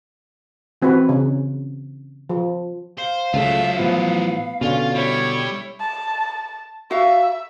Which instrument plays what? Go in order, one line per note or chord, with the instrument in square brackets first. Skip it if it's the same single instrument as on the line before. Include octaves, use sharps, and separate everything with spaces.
[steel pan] E3 C4 F#4 B4
C#3
F3
[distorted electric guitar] C5 [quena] F5
[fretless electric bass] C#2 C#3 A3 [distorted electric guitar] F#3 F4 [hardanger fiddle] E5
[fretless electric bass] A2 E3 F3 [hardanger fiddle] B3
[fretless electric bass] B2 D3 [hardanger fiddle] C#4 [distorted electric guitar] F4
[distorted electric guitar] G3 [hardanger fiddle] E4 C#5
[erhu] A5
[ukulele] F#4 F5 [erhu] E5